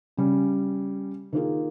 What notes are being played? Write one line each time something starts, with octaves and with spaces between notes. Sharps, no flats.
C#3 G3 C#4
D#3 A#3 F4 G#4